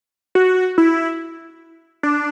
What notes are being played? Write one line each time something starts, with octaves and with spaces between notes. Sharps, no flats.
F#4
E4
D4